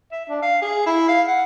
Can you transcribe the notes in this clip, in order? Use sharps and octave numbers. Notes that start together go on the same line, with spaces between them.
E5
D4
F5
G#4
E4
F5
F#5